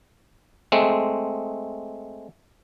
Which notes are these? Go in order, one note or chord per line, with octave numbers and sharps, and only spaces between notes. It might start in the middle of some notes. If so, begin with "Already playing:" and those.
G#3 A3 C4